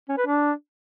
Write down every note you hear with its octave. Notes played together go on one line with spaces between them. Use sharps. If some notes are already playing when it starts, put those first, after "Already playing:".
C#4
B4
D4